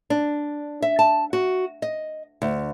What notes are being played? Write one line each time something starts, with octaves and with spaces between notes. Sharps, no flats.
D4
E5
A5
F#4
D#5
D2